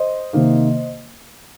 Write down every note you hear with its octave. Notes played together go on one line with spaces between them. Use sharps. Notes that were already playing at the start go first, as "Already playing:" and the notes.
Already playing: C5 D#5
C3 D#3 A#3